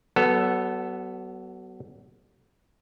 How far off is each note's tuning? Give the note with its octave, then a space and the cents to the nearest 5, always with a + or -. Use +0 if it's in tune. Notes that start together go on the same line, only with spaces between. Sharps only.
F#3 +35 B3 +0 A4 +5